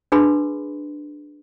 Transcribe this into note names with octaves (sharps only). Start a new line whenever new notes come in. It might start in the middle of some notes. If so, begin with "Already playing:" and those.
D4 G#4 B4 B5 C6